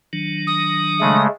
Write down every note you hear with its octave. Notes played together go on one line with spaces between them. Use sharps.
D#3 F#3 D4
D#6
C#3 G#3 A3